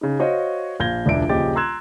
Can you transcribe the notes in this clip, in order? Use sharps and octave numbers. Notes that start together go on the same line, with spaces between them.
C#3 D#4
F#4 C5 C#5 D#5 F5
A#1 F5 G6 G#6 A#6 G7
E1 C#2 D4 E5 D7
D#1 A#1 C#3 G4 D#5 A6
A#5 C6 E6 F#6 G#6 E7